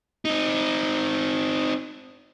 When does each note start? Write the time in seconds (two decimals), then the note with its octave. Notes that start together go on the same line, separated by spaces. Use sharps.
0.25 C4 D#4